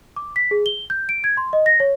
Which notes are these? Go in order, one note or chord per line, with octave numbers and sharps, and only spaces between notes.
D6
B6
G#4
G7
G6
D7
G#6
C6
D#5
A#6
C#5